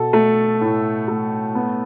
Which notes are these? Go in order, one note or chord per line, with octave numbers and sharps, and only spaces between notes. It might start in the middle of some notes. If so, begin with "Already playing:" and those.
Already playing: B2 A4
A3
A2
A3
B3